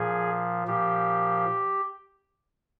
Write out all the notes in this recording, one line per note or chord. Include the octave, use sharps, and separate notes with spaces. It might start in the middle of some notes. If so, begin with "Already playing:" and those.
Already playing: A#2 F3 G#4
A#2 F3 G4